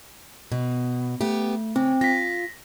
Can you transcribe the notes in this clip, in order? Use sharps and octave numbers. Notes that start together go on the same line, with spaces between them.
B2
A3 B3 G4
C#3 C4
F4 A#6 B6